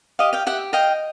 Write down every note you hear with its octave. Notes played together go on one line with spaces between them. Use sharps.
G4 D#5 F5
F5 G5
G4 E5 F#5
D#5 F5 G5